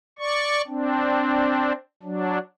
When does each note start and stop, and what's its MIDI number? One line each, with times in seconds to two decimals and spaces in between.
0.19 0.62 74
0.19 0.62 85
0.67 1.73 60
0.67 1.73 62
2.03 2.38 54
2.03 2.38 62